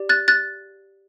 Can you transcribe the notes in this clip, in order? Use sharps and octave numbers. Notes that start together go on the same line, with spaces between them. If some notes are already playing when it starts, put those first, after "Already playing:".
Already playing: G4 D5
F#6 A6
F#6 A6